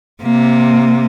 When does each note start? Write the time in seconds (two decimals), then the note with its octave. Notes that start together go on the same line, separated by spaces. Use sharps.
0.22 C3 A#3